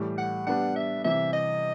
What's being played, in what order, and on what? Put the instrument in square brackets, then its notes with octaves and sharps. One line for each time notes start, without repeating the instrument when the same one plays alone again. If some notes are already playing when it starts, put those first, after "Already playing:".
Already playing: [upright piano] A2 E3 G3
[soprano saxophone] F#5
[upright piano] G3 B3 D4 [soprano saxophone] F#5
[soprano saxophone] E5
[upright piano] C3 E3 G3 [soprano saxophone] E5
[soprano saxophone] D#5